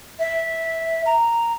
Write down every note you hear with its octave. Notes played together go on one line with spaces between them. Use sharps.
E5
A#5